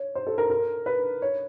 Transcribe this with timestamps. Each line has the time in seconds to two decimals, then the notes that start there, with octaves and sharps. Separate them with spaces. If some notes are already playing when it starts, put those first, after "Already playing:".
Already playing: C#5
0.15 C5
0.27 A4
0.38 A#4
0.50 A#4
0.86 B4
1.22 C#5